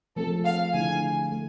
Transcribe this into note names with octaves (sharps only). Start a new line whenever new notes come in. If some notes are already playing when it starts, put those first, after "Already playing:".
F3 A3 C4 G#4 A4
F5
D3 A3 E4 G#4 G#5
A3